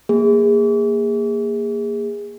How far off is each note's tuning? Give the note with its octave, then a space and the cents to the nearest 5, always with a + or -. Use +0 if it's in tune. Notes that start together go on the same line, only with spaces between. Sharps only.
A#3 +0 G#4 -20